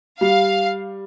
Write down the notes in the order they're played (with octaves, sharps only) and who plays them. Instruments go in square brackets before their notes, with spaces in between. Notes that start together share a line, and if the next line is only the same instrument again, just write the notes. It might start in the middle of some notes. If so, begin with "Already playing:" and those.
[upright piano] G3 [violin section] F5